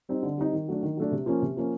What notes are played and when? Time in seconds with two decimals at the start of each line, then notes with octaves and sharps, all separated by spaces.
0.09 G3 C4 D#4
0.23 D3
0.38 G3 C4 D#4
0.53 D#3
0.68 F#3 A3 D4
0.83 D#3
0.97 F#3 A3 D4
1.12 C3
1.26 F3 A#3 C#4
1.42 C3
1.57 F3 A#3 C#4